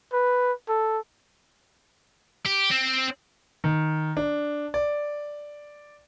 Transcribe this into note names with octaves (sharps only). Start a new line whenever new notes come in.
B4
A4
G4
C4
D#3
D4
D5